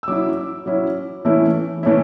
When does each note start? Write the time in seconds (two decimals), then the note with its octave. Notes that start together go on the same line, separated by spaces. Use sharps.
0.03 E6
0.08 F#3 C#4 E4 D6
0.66 F#3 C#4 E4
1.25 E3 A3 C#4 E4
1.83 E3 A3 C#4 E4